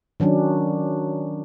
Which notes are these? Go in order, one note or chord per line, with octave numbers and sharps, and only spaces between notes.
D#3 F#3 C#4 D4